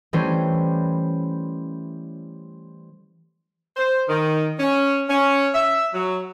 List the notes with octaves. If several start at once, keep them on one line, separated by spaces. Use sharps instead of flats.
E3 G3 A3 C#4 C5
C5
D#3
C#4
C#4
E5
F#3